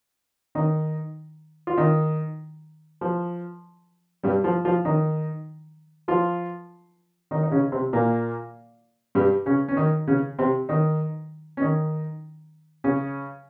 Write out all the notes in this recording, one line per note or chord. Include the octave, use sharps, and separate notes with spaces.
D#3 D#4
F4
D#3 D#4
F3
G2 G3
F3 F4
F3 F4
D#3 D#4
F3 F4
D#3 D#4
D#4
C#3 C#4
C3 C4
A#2 A#3
G2 G3
C#3 C#4
C#4
D#3 D#4
C#3 C#4
C3 C4
D#3 D#4
C#4
D#3 D#4
C#3 C#4